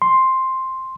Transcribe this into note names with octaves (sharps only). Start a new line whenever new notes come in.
C6